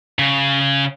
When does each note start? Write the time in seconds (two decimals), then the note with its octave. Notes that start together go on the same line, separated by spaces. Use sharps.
0.19 C#3